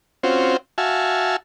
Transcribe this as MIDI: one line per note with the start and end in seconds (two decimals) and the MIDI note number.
0.23 0.57 60
0.23 0.57 61
0.23 0.57 65
0.23 0.57 66
0.23 0.57 72
0.78 1.36 66
0.78 1.36 76
0.78 1.36 77
0.78 1.36 80
0.78 1.36 81